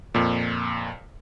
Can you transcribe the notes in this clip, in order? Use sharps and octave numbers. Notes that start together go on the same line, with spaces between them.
F2 A#2